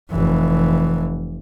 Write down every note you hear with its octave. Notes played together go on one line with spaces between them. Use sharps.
F1 E3